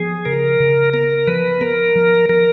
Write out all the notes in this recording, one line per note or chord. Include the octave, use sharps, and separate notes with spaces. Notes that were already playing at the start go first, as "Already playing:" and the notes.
Already playing: F3 B3 G#4
C#3 A#4
C#3
B3 A#4
F3 B4
B3 A#4
F3
F3 A#4